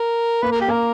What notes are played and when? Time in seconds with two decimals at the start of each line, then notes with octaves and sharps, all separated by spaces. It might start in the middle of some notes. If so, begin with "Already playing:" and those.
Already playing: A#4
0.42 A#3 B4
0.52 A#4
0.61 G4
0.68 A#3 A#4